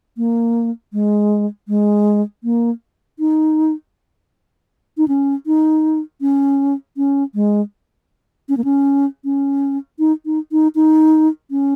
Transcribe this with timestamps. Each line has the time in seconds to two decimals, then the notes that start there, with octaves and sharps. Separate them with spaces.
0.17 A#3
0.93 G#3
1.68 G#3
2.44 A#3
3.19 D#4
4.97 D#4
5.08 C#4
5.47 D#4
6.21 C#4
6.97 C#4
7.35 G#3
8.49 C#4
8.57 A#3
8.64 C#4
9.25 C#4
9.99 D#4
10.26 D#4
10.52 D#4
10.75 D#4
11.51 C#4